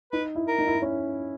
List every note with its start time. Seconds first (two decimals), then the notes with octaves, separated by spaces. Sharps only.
0.12 D#4 B4
0.35 E4
0.48 A#4
0.59 D#4
0.67 E4
0.75 D#4
0.82 C#4